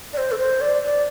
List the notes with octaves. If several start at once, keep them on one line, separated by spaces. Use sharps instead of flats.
D5
C5
A4
C5
D5
D5